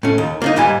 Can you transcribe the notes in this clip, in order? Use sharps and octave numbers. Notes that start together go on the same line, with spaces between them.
A2 C#4
D#2
A#3 D4 D#4
D#2 G#2 G3 E4 G#5